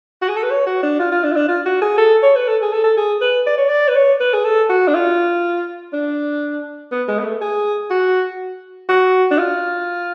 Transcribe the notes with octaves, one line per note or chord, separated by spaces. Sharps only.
F#4
G#4
A4
B4
C#5
F#4
D4
F4
F4
D4
F4
D4
F4
F#4
G#4
A4
C#5
B4
A4
G#4
A4
A4
G#4
B4
D5
C#5
D5
B4
C#5
B4
G#4
A4
F#4
D4
F4
D4
B3
G#3
B3
A3
G#4
F#4
F#4
D4
F4